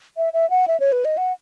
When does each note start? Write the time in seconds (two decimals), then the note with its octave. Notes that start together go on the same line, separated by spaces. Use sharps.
0.17 E5
0.33 E5
0.50 F#5
0.68 E5
0.80 C#5
0.92 B4
1.05 D#5
1.17 F#5